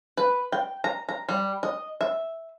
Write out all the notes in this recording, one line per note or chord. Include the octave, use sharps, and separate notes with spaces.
B4
G5
A#5
A#5
G3
D#5
E5